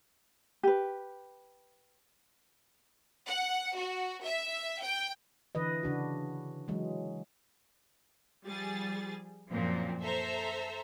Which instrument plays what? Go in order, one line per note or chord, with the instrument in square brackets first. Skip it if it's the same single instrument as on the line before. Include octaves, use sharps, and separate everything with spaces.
[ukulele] G4 B4
[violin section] F#5
F#4
E5
G5
[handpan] D3 E3 B4 D#5
C#3 D4 F#4
E3 F#3 G#3
[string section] F3 G3 G#4 A6
F#2 A#2 F3 C4
A4 C5 E5 A#5